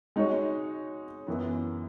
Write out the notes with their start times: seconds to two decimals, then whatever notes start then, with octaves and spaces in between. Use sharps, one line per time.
0.16 G#3 D#4 F#4 C#5
1.27 F#2 E3 B3